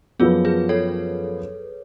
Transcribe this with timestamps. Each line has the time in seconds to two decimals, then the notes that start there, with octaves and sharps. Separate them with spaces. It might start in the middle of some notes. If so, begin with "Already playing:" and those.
0.19 F#2 F3 B3 F4 G#4
0.45 G#4 B4
0.69 A4 C#5